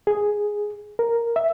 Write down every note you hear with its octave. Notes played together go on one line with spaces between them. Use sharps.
G#4
A#4
E5